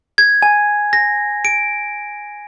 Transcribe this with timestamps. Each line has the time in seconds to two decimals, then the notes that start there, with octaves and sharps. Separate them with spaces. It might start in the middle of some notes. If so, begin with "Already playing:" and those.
0.18 G#6
0.42 G#5
0.93 A#6
1.45 D7